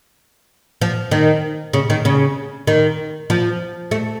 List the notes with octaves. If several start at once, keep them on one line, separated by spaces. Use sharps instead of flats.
F3
D#3
C#3
D#3
C#3
D#3
F3
A3